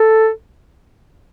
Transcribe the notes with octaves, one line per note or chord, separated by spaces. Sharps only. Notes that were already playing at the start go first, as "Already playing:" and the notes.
Already playing: A4